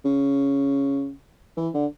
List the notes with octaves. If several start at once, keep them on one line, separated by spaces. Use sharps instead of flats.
C#3
E3
D3